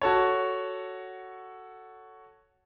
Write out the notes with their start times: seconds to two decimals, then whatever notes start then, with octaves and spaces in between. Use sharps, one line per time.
0.02 F#4 A4 C#5